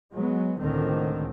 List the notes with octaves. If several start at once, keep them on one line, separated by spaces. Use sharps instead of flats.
F#3 G#3 B3
C#2 A2 D3 D#3 C4